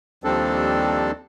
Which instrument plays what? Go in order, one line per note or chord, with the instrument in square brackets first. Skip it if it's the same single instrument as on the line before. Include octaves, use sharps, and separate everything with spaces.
[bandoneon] D#2 F3 G3 C4 D4 A4